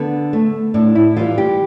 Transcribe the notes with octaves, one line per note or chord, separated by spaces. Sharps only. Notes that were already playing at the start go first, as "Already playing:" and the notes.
Already playing: D3 B3
A3
A2 D4
E4
E3 G3 F4
G4